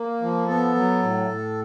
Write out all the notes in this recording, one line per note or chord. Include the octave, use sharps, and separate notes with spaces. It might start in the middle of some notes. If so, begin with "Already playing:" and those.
Already playing: A#3
F3
B3 A4
F#3
A2
A2